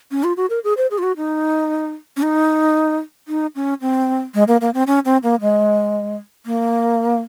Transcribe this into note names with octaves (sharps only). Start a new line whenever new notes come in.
C#4
F4
F#4
A#4
G#4
C5
G#4
F4
F#4
D#4
C#4
D#4
D#4
C#4
C4
G#3
A#3
A#3
C4
C#4
C4
A#3
G#3
A#3